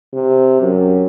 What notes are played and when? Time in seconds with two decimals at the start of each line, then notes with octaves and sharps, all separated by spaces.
0.13 C3
0.61 F#2